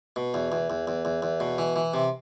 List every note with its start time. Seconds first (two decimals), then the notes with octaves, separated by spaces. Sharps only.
0.16 B2
0.34 E2
0.52 E2
0.70 E2
0.87 E2
1.05 E2
1.22 E2
1.40 B2
1.58 E3
1.76 E3
1.94 C3